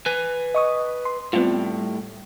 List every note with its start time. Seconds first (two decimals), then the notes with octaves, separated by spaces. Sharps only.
0.06 B4 G#5
0.54 D#5 C#6 D#6
1.05 C6
1.33 A2 G3 B3 C4 F4